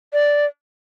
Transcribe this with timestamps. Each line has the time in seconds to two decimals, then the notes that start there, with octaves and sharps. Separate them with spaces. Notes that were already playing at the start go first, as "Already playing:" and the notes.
0.13 D5